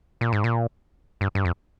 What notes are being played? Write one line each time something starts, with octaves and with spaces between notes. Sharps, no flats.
A#2
G#2
A#2
G2
G2
F2